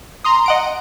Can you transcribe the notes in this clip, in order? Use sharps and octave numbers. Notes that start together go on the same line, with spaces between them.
A#5 C6 D#6
D#5 F#5 D7